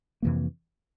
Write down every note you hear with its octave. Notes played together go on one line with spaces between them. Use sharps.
F2 C3 E3 A#3